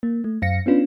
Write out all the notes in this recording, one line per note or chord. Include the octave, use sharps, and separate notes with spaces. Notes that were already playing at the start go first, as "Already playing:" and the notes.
A#3
A3
F#2 F5 A#6 C#7
B3 C#4 D4 F4 B4